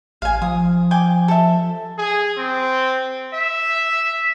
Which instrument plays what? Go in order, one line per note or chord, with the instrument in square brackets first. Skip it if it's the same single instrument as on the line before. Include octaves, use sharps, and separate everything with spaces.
[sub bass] A1 [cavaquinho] F5 G#5
[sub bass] F3 [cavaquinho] D#6
[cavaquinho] G5 G#5 D6
A4 E5
[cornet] G#4
C4
E5